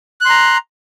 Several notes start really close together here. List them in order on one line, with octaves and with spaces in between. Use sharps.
F#6 C6 A#5